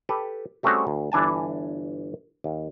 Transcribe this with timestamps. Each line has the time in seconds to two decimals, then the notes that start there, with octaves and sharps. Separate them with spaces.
0.09 G4 A4 B4
0.63 G3 A3 C4 C#4 F#4 G#4
0.87 D2
1.12 G1 E3 D4 G#5 A5
2.44 D#2